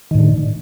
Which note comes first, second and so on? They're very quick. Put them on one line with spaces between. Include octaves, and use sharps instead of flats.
D#3 A2 D3